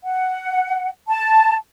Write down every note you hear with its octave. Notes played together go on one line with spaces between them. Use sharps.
F#5
A5